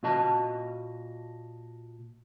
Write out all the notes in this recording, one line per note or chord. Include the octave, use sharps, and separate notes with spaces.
A#2 F#4 D#5 A5